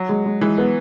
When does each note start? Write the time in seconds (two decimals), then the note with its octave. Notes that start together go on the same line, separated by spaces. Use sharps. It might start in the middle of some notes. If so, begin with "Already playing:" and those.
Already playing: F#3
0.09 G#3
0.26 G#3
0.41 E3 G#3
0.58 B3